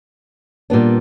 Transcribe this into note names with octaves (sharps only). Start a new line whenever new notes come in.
A#2 G3 B3 D4